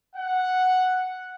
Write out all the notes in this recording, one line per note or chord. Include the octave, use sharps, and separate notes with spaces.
F#5